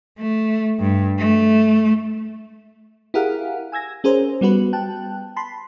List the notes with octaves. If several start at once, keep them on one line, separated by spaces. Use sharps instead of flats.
A3
G2
A3
E4 G4 G#4 A#4 F5 F#5
G#5 E6 G#6 A#6
C#4 G#4 A#4 C5
G3 B3 F#4 B4
G5 A5 F#6
A5 B5 C6